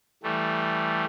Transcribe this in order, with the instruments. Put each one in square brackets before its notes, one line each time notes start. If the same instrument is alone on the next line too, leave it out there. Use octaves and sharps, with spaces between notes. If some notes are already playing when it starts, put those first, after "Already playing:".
[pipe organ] E3 G3 A3